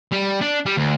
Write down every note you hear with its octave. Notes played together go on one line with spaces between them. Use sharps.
G3
D4
G3
D2